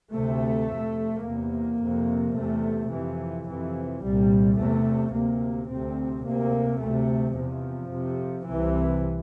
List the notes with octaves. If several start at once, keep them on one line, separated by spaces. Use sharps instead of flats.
D2 C3 A3
F2 C3
E2 C3 A#3
F2 C3
E2 C3 A3
F2 C3 E3
F2 C3 E3
C2 A#2 G3
E2 C3 A3
D2 C3 A#3
C3 C4
D2
D2 C3 A#3
D2 C3 A3
E2 C3 F3
F2 C3
C2 C3 E3